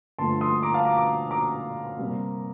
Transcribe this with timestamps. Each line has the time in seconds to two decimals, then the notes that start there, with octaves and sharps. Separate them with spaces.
0.18 G2 D3 F3 A3 A5 C6
0.41 C6 D#6
0.63 A#5 D6
0.74 F5 A5
0.85 A#5 D6
0.96 A#5 D6
1.31 A#5 D6
1.98 C3 G3 A#3